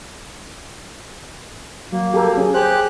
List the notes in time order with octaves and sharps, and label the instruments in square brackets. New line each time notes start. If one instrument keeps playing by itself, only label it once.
[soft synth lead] F#3 [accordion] A#3
[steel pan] G4 A4 A#4
[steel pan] C#4 [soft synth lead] G#4
[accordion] G4 F#6 [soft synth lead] G#4 [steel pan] C5